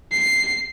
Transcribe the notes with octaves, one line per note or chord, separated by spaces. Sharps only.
C7